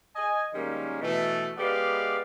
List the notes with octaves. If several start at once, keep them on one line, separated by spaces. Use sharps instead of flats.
D#5 G#5
D#3 G3 G#3 A#3 C#4
B2 E3 A3
G#3 B3 G4 B4 D5 F5